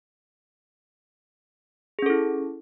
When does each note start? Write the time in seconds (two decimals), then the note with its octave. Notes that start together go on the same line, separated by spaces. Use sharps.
1.99 G#4
2.02 C#4
2.06 A4
2.10 E4